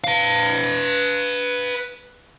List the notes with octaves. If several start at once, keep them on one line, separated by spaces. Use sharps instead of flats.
B4 F5